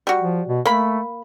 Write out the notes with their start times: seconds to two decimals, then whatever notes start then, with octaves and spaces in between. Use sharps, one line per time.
0.07 G3 F#4
0.21 F3
0.48 B2
0.65 A3 A#3 B5